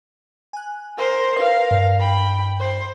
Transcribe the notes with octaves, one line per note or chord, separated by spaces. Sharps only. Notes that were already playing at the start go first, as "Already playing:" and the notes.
G#5 F#6
A#4 C5
A#4 B4 F5
G2
G5 B5
C5